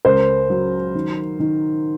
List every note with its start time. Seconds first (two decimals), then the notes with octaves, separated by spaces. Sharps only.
0.05 C#2 A#4 C5
0.50 F#3
0.95 D#3
1.40 D#3